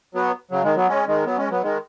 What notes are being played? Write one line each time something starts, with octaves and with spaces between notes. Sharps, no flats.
F#3 B3
C#3 F#3
D#3 G#3
F#3 B3
G#3 C#4
D#3 G#3
F#3 B3
G#3 C#4
F#3 B3
D#3 G#3